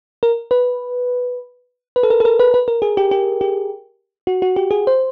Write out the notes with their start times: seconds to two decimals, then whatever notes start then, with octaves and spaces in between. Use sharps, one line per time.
0.23 A#4
0.51 B4
1.96 B4
2.03 A4
2.10 A#4
2.20 A4
2.25 A#4
2.39 B4
2.54 B4
2.68 A#4
2.82 G#4
2.97 G4
3.11 G4
3.41 G4
4.27 F#4
4.42 F#4
4.56 G4
4.71 G#4
4.87 C5